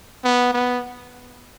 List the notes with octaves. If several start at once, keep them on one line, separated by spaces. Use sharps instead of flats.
B3
B3